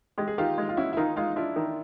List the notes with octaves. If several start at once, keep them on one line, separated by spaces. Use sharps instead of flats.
G#3 G4
G#4
D#3 F4 G4
G#3
F4
C#4 E4 F#4
E4
D#3 D#4 F4
G#3 D#4 F4
D4 E4 F4
D#3